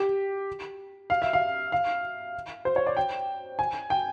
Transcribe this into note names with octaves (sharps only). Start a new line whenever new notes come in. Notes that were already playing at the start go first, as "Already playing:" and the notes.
Already playing: G4
F5
E5
F5
F5
C5
C#5
D5
G5
G#5
G5